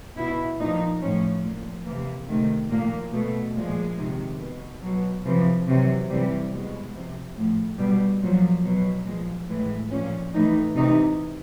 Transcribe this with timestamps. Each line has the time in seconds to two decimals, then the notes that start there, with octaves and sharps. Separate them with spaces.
0.17 B2 E4
0.59 A#2 F3 D#4
1.01 A2 F3 C#4
1.44 A#2 F3
1.85 C3 E3 A#3
2.29 C3 D#3 A3
2.70 A#2 F3 A#3
3.12 B2 A3
3.55 A#2 F3 G#3
3.98 C3 D#3
4.40 B2
4.82 B2 F#3
5.25 C3 E3 F3
5.68 C3 E3 F#3
6.09 C3 E3 G3
6.51 B2 G#3
6.95 C3 F3
7.36 A2 F3
7.79 B2 G3
8.21 A#2 F3 F#3
8.63 B2 F#3
9.06 A#2 F3 G#3
9.48 A2 E3 G#3
9.91 A#2 F3 C#4
10.34 A2 E3 D#4
10.75 C3 E3 D#4